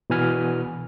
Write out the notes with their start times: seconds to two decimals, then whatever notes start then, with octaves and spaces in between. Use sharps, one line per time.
0.10 B2 E3 B3 G#5 F6